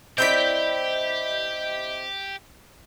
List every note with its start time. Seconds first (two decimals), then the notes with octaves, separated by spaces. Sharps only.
0.18 C4 E4 G4 D5 D#5 G6 B6